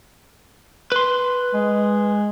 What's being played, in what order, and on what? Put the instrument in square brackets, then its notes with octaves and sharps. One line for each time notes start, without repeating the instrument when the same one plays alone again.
[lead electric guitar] B4 C6
[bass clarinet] G#3